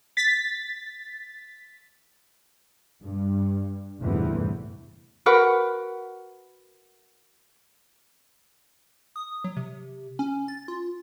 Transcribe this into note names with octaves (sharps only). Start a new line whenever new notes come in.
A6 B6
G2
G1 E2 A2 C3 E3
F#4 A#4 B4 F#5
D#6
F#3
C3
C#4
A6
F4